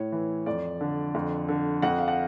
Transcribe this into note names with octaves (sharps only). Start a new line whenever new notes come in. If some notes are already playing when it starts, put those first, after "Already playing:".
Already playing: A2 C#5
E3
F2 D5
D3
F2
D3
F2 F#5
F5
F#5